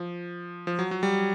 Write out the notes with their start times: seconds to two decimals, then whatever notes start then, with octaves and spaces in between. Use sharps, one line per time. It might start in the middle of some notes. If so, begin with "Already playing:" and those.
Already playing: F3
0.67 F3
0.79 F#3
0.91 F#3
1.03 G3